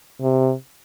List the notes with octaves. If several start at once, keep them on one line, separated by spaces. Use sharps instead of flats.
C3